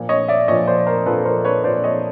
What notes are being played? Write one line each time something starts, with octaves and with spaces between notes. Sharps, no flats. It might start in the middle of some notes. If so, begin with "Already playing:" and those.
Already playing: A#2 F3
C#5 D#5
D5 E5
A#2 F3 C#5 D#5
C5 D5
A#4 C5
A#2 F3 A4 B4
A#4 C5
B4 C#5
A#2 F3 C5 D5
C#5 D#5